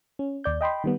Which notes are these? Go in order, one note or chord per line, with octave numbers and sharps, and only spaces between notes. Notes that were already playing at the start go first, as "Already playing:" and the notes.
C#4
D#2 D5 G6
D#5 G5 B5 C6
D#3 G3 B3